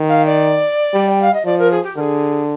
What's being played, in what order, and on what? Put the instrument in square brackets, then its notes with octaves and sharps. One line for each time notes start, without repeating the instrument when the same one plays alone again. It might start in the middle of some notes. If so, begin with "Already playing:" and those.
Already playing: [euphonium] D#3
[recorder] F5
D5
[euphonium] G3
[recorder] G5
F5
D#5
[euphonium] F3 [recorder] D5
[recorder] A#4
G#4
G4
[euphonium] D3 [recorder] G#4 A#4